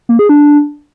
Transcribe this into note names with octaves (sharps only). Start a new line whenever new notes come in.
A#3
G#4
D4